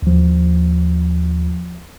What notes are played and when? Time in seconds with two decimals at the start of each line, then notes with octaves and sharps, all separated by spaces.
0.02 D#2 F3